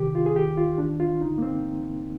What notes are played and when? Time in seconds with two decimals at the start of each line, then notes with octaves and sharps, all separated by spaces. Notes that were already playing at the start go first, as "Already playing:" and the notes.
Already playing: D2 C3 D#3 G4
0.15 F4
0.26 G#4
0.35 D#2 D#3 G4
0.57 F4
0.78 D#2 D#3 D4
1.00 F4
1.21 G2 D3 D#4
1.38 A#3
1.42 C4